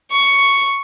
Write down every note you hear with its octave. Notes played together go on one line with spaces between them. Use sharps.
C#6